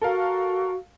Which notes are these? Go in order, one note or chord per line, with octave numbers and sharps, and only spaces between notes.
F#4 A4 A#4 F5